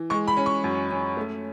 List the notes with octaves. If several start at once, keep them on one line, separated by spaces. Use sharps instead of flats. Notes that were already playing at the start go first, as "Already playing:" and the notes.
Already playing: E3
G#3 C#6
B5
C#4
C#6
F#2
C#4
A3